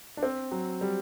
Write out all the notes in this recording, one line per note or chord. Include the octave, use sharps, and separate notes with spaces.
D4
C4
F#3
G3